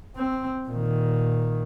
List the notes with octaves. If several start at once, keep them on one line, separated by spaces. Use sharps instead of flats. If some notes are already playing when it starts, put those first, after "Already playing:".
C4
A#2 D#3